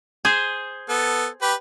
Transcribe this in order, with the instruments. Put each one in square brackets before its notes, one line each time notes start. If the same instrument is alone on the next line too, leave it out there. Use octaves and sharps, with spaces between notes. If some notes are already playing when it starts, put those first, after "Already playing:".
[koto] G#4 C5
[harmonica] B3 A4
G4 B4